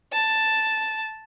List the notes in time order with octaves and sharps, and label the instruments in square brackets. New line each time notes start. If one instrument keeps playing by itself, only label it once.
[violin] A5